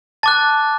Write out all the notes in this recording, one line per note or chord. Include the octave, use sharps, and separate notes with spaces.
A5 D6 F#6 A6